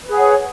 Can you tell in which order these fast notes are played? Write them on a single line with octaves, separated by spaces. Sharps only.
B4 G#4 F#5 C#5